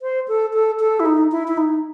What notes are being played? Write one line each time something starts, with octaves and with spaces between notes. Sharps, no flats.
C5
A4
A4
A4
E4
D#4
E4
E4
D#4